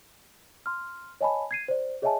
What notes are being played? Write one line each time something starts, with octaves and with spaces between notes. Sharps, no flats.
C6 F6
C#5 D#5 G#5 A5 B5
G#6 C7 D#7
C5 D5
G#4 C#5 D#5 E5 G#5 A5